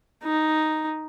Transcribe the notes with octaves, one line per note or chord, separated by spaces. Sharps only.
D#4